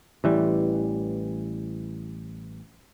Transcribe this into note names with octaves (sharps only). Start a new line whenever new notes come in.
A1 E3 G3